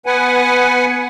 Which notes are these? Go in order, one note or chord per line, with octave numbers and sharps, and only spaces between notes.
B3 B4 F#5 G#5